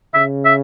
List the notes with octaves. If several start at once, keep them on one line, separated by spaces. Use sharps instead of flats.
C#3 E5
E5